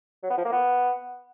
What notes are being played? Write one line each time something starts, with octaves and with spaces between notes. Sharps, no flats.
F#3
B3
F3
A#3
B3